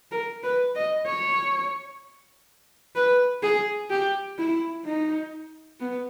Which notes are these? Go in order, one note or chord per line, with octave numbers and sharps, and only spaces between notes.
A#4
B4
D#5
C#5
B4
G#4
G4
E4
D#4
B3